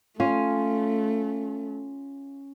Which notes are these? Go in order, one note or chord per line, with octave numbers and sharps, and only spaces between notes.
A3 C#4 F4